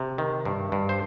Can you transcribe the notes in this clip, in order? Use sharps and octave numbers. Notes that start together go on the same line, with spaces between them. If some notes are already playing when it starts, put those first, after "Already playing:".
Already playing: C3
D#3
G2
G2
C5